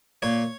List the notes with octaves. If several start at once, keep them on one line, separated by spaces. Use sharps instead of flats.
A#2 C#5